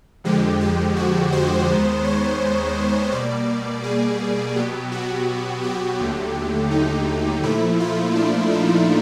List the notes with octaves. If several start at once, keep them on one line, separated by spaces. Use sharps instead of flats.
F2 D3 F3 G#3 G4
G4
F#4
C5
D#2 D#3 G#3 B3
C#5
B2 G3 A#3 D5
G#4
B2 F#3 B3 G4
F#4
G4
D#2 D3 F#3 A3
D#4
A#2 F3 A3 E4
F4
D4
D#4